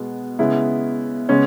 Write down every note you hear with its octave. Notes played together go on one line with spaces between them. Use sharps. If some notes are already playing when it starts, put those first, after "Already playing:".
Already playing: B2 G#3 B3
C#3 G#3 B3 E4
C#3 G#3 B3 C#4